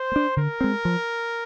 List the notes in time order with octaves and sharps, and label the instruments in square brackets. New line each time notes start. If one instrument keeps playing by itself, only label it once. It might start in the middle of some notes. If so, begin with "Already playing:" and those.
Already playing: [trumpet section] C5
[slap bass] A#3
D4
[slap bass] D3 [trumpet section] A#4
[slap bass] G#3 C4
F3